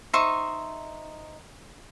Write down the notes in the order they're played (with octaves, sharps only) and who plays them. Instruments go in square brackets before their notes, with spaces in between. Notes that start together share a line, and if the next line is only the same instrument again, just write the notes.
[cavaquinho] D#4 C5 E5 C#6